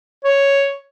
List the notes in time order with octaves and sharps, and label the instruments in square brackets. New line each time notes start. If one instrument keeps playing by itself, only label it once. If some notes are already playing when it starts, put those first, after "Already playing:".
[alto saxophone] C#5